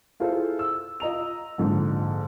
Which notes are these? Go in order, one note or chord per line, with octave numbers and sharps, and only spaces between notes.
E4 F4 G#4 A4 C5
E6
F4 D#5 A#5 F7
A#1 G#2 D3